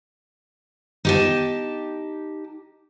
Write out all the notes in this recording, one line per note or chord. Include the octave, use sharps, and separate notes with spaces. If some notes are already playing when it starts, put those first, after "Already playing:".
D#4 G4 A5